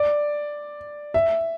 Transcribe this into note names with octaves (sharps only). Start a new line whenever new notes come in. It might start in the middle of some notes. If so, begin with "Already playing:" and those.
Already playing: D5
E5